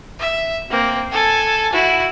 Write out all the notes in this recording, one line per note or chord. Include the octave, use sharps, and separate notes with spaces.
E5
A#3 C4
A4 G#5
E4 F#4